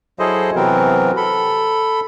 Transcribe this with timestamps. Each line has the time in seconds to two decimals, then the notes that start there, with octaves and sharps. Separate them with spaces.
0.19 F#3 E4 G#4 A4 C5 D#5
0.56 C3 E3 F#3 B3 C4 A#4
1.17 A4 B5